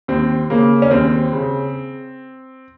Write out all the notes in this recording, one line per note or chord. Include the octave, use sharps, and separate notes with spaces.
D#2 C4
C#3 A#3
C#4
D#2 C4
C#3